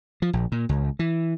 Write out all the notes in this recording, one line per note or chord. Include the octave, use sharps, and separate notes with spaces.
F3
A#1
A#2
C#2
E3